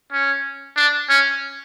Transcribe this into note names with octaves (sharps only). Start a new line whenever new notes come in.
C#4
D4
C#4